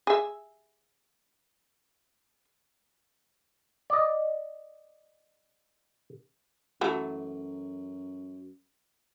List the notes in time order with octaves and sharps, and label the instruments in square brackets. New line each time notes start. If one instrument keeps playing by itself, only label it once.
[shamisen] G#4 E5
[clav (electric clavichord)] D5 D#5
[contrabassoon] F#2 [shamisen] E3 F#3 A3